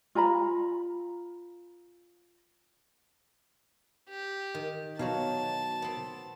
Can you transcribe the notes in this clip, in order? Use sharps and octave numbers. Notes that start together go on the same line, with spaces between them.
F4 G#5 A#5 B5
G4
D#3
B2 F#3 D#4 C#5 F5 A5
B3 C4